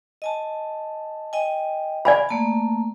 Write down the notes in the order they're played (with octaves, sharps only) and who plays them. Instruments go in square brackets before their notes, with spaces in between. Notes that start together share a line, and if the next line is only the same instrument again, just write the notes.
[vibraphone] D#5 G#5 A5
D#5 G5 G#5
[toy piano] D5 G#5 B5
[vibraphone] A3 A#3 A5